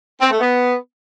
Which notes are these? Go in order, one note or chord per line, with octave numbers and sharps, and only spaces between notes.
C4
A3
B3